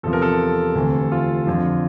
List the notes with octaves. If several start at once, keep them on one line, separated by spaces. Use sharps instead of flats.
E2 C3 F3 A4
A#4
A4
D2 C3 E3
F4
F2 D3 F3